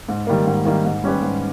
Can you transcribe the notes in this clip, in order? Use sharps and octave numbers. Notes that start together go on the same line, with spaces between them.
G#2
D#3 G3 A#3
G#2
D#3 G3 A#3
G#2
G3 C#4 G4 B4
G#2